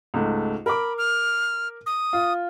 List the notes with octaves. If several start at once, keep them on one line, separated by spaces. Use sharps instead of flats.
C#2 G#2 A3
A#4 B5 D6
F6
D#6
F4